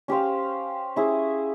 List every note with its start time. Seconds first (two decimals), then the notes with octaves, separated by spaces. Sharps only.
0.08 C#4 G4 C5 F5
0.96 C#4 E4 G#4 E5